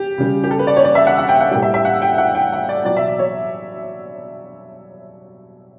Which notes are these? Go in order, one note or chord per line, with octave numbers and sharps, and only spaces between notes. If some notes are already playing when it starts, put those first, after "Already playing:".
Already playing: G4
C#3 G3
G4
A4
B4
D5
C#5
D5
E5
F#5
F#5
G5
F#5
A2 G3 G5
E5
E5
F#5
G5
F#5
G5
F#5
D5
B2 F#3 D5
E5
D5
C#5